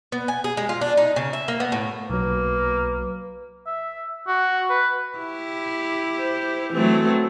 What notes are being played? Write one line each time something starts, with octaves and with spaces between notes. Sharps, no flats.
B3
G#5
G#4
G#3
F4
D4
D#4
C#3
E5
A#3
B3
A2
B1 F#3 A#3 B4
E5
F#4
B4
E4 G4
C5
E3 F#3 A3 C4